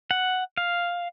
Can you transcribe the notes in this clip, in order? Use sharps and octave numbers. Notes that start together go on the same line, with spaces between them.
F#5
F5